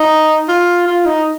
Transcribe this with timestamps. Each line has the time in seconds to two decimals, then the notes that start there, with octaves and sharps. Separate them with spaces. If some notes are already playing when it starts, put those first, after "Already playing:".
Already playing: D#4
0.48 F4
0.87 F4
1.05 D#4